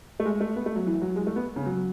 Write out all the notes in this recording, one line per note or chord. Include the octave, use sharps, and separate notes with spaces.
A3
G#3
A3
B3
A3
F#3
E3
F#3
G#3
A3
B3
C#3
F#3